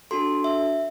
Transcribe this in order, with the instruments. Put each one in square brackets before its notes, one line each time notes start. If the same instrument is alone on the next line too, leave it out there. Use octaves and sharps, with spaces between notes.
[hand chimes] D4 F#4 A4 C6
E5